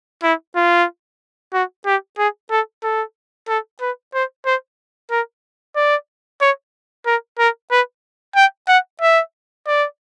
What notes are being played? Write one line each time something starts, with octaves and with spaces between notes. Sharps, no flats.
E4
F4
F#4
G4
G#4
A4
A4
A4
B4
C5
C5
A#4
D5
C#5
A#4
A#4
B4
G5
F#5
E5
D5